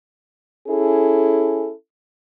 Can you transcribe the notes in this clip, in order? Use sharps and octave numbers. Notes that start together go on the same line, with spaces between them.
C#4 E4 G#4 A4